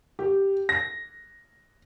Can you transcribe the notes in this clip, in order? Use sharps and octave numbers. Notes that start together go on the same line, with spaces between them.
G4
A#6